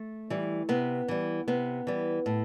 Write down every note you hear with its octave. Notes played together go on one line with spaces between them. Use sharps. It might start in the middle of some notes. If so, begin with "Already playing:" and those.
Already playing: A3
E3 G3
C3 B3
E3 G3
C3 B3
E3 G3
A2